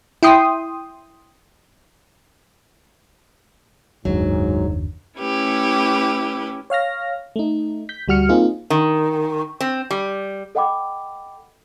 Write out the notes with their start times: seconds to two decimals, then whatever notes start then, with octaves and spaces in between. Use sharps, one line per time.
0.23 E4 G5 C6 D#6
4.05 F#1 D#2 G#2 F#3 D4
5.19 A3 C#4 E4 G4 B4
6.70 C#5 F5 F6 A#6
7.36 A3 D#4
7.89 G6 B6
8.08 D2 G3 F#4 F6 C#7
8.29 A#3 C4 D#4 F4 G#4
8.70 D#3
9.61 C4
9.91 G3
10.55 A4 D#5 F#5 G5 B5 D6